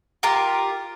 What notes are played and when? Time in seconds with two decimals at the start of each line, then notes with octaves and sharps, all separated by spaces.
0.23 F4 G4 A#4